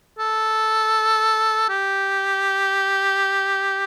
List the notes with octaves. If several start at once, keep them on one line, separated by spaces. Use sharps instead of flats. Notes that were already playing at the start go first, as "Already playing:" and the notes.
A4
G4